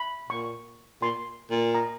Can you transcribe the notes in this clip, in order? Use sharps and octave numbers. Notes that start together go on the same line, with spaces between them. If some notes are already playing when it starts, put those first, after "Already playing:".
Already playing: B5
A#2 C#6
A#2 C6
A#2
A#5